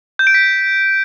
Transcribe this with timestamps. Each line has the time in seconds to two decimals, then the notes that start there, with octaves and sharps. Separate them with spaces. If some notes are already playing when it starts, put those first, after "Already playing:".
0.19 G6
0.27 D7
0.34 B6